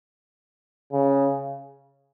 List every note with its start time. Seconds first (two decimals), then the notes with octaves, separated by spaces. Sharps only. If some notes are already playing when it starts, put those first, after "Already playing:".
0.92 C#3